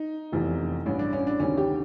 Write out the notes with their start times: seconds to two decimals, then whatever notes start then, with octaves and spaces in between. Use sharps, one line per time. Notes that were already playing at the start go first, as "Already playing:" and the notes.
Already playing: D#4
0.32 F1 E2 C3 E3
0.86 A1 G2 E3 C#4
0.99 D4
1.13 C#4
1.27 D4
1.40 D2 C3 D#3 C#4
1.58 G4